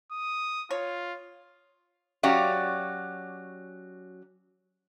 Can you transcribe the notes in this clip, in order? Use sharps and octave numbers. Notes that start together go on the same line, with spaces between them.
D#6
F4 C#5
F#3 C#4 F#4 G4 D5 F5